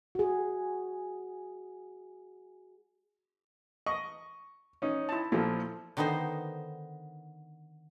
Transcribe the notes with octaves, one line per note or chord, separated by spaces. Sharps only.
F#4 G#4
D#5 C#6
C#4 D#4
E4 A5
A#2 F3 E4 A4
D3 D#3 B3 D#4 C5